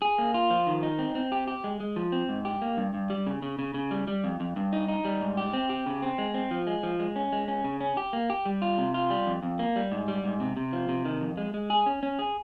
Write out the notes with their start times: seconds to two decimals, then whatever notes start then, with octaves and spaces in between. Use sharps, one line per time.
0.02 G#4
0.18 A#3
0.34 F4
0.50 F3
0.67 D#3
0.83 D#4
0.99 C4
1.15 C4
1.32 G4
1.47 G4
1.64 G#3
1.80 G#3
1.96 F3
2.12 C4
2.29 G#2
2.45 G4
2.62 A#3
2.77 G2
2.94 G2
3.10 G3
3.26 C#3
3.42 C#3
3.59 C#3
3.74 C#3
3.91 G3
4.07 G3
4.24 F2
4.40 F2
4.56 G2
4.73 D#4
4.88 D#4
5.05 G3
5.21 G#2
5.37 G4
5.53 C4
5.70 G4
5.86 C#3
6.02 C4
6.18 G#3
6.34 C4
6.51 F3
6.67 G#3
6.83 F3
7.00 G#3
7.16 C#4
7.32 G#3
7.48 C#4
7.64 C#3
7.81 C#4
7.97 G4
8.13 A#3
8.30 G4
8.45 G3
8.62 F4
8.78 C3
8.94 F4
9.10 G3
9.26 F2
9.43 F2
9.59 A#3
9.76 G3
9.92 G#2
10.08 G3
10.24 G#2
10.40 C3
10.57 C3
10.73 F3
10.89 C3
11.05 D#3
11.21 F2
11.37 G#3
11.54 G#3
11.70 G#4
11.86 C#4
12.03 C#4
12.19 G#4